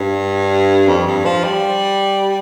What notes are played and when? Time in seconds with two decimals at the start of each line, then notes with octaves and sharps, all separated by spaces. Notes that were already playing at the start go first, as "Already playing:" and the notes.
Already playing: G2
0.88 F2
1.07 G2
1.25 F3
1.44 G3